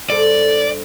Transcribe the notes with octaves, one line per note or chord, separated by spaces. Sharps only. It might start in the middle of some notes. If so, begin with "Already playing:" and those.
G2 A4 C5 D5